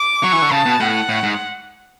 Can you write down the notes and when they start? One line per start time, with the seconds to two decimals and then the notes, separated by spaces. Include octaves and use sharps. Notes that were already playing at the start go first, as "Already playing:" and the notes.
Already playing: D6
0.23 F#3 C#6
0.33 E3
0.42 D3
0.51 C#3 A5
0.66 B2
0.80 A2 F#5
1.09 A2
1.23 G#2